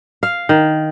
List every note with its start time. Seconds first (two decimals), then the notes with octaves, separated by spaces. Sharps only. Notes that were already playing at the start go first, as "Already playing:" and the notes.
0.23 F5
0.49 D#3